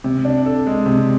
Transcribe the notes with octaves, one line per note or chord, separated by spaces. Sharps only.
C3
D4
A4
G#3
C3